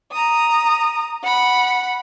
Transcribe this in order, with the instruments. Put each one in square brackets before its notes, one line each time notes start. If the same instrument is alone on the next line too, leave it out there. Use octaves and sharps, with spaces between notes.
[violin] A#5 D#6
F#5 B5